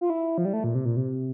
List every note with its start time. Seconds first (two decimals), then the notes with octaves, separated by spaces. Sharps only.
0.01 F4
0.10 E4
0.38 F3
0.45 G3
0.53 A3
0.64 A#2
0.75 C3
0.85 A#2
0.96 C3